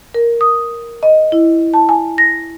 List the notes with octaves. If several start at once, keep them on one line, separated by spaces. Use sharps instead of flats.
A#4
D#6
D#5
E4
A5
G#5
A#6